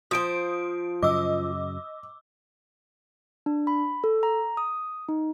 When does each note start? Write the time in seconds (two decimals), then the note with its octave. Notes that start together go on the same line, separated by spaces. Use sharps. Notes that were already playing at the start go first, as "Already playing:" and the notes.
0.11 F3 C5 D#6 D7
1.03 F#2 C#3 F#3 D#5 D6 E6
3.46 D4
3.67 B5
4.04 A4
4.23 A#5
4.57 D#6
5.09 D#4